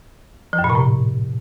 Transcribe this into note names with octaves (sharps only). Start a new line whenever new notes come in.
F3
F#2
A#2
C3
A2